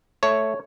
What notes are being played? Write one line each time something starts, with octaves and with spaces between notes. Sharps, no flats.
A3 C#5